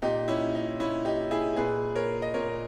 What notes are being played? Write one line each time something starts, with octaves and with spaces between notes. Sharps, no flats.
A#2 D#4 G4
C#4 E4
D#4
A#2 C#4 E4
D#4 G4
E4 G#4
A#2 G#4 B4
A#4 C#5
D#5
A#2 A#4 C#5